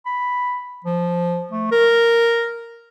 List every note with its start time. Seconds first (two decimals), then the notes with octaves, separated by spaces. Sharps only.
0.06 B5
0.84 F3
1.51 A3
1.72 A#4